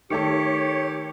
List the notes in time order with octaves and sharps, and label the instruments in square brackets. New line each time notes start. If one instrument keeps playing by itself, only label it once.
[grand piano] D#3 A3 A4 [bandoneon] G4 [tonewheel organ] C#5